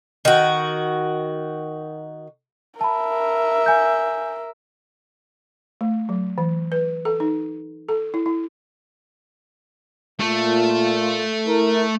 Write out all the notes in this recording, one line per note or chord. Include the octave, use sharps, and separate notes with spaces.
D#3 F#4
A#4 E5 A5 B5
G#5 G6
A3
F#3
E3
B4
A4
D#4
A4
E4
E4
A#2 A3 F4
E4 A#4